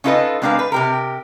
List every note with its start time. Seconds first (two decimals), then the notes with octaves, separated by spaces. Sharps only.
0.04 C#4 D#4 F4 A4 B4 D#5
0.42 G#3 C4 D4 A#4 B4 F5
0.59 B4
0.72 C3 G4 A#4